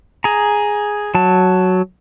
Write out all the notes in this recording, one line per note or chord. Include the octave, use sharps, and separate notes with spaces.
G#4 A#5
F#3 A5